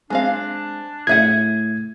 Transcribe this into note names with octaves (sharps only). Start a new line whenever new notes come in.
G#3 C4 D4 F5 G#5
A2 G#4 E5 F#5 G#6 D#7